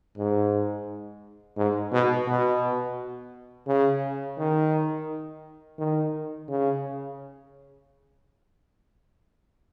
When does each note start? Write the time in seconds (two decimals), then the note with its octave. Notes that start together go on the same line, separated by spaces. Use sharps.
0.17 G#2
1.57 G#2
1.92 B2
2.27 B2
3.67 C#3
4.38 D#3
5.78 D#3
6.49 C#3